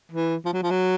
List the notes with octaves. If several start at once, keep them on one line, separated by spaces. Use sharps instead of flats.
E3
F3
F#3
F3
F#3